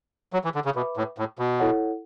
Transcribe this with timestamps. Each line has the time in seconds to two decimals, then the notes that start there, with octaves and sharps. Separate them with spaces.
0.33 F#3
0.44 E3
0.55 D3
0.65 C#3
0.75 B2 B4 E5 B5 D6
0.97 A2
1.18 A2
1.39 B2
1.60 E4 A4 C#5 F#5